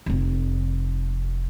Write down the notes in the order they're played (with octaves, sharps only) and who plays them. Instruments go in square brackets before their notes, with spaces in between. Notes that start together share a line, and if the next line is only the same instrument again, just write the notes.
[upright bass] F1 C4